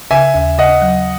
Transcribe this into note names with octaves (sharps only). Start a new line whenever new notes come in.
C#3 E5 G#5
D#2
C#3 D#5 F#5
F#3